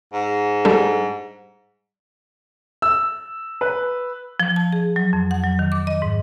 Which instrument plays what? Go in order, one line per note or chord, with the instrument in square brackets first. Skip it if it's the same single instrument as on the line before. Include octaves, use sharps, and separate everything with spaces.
[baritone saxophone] G#2
[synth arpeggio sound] G3 D4 A4
[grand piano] E6
B4
[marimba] F3
A5
G#4
F#3
F2
F#5
F#3
D#3
D6
D#5
G#2